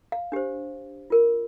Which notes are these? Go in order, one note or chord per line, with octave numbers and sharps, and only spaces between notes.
F5
D4 G4 C5
F4 A#4